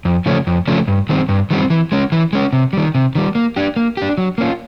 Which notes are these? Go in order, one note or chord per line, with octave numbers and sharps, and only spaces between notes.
F2
C#3 F3 A3 C#4
F2
C#3 F3 A3 C#4
G2
D#3 G3 C4
G2
D#3 G3 C4
E3
G#3 C#4
E3
G#3 C#4
C3
D#3 G3
C3
D#3 G3
A#3
D4 G4
A#3
D4 G4
F#3
A#3 C#4 F4